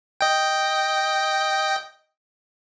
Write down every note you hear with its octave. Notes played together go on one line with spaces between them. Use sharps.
D#5 G5